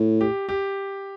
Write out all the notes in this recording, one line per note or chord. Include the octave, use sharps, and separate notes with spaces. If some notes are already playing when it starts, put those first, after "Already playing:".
Already playing: A2
G4
G4